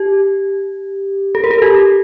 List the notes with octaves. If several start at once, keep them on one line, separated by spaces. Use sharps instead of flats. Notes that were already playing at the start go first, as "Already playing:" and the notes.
Already playing: G4
A4
A#4
A4
G4